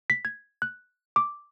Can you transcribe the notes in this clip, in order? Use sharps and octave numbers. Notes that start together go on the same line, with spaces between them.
B6
G#6
F#6
D6